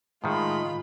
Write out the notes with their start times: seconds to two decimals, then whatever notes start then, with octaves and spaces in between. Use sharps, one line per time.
0.24 A2 D#3 G#3 F4 B5